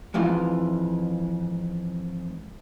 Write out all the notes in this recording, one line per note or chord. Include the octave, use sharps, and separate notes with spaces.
F2 G#2 E3 F4